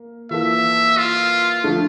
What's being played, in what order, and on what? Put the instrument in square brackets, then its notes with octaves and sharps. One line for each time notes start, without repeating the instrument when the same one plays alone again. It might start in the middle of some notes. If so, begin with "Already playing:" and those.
Already playing: [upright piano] A#3
[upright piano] E3 A#3 F4 A4 [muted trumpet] E5
[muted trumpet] F4
[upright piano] D3 F3 A3